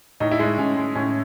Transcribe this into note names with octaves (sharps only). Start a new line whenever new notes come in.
A2 D#4
E4
G#3 D#4
A2 C#4
G#3
A2 C#4